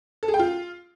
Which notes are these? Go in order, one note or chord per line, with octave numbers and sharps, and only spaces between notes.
A4
G#4
G5
F4